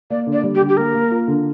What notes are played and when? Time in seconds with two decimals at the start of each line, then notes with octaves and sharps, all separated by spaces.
0.10 A#3 D5
0.27 D3
0.33 D5
0.44 G3
0.55 G4
0.60 D3
0.69 G4
0.77 A#3 A#4
0.95 A#3
1.11 F4
1.28 D3